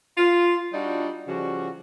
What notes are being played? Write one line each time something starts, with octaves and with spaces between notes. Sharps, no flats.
F4
G3 D4 D#4 F4 F#4
C#3 F3 G3 F#4